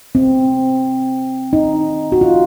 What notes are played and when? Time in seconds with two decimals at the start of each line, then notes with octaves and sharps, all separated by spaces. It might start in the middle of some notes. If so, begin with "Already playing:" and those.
0.15 C4
1.53 D#4
2.12 F#4
2.21 F4